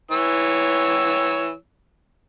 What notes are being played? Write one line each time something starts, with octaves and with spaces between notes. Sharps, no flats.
E3 C#5 E6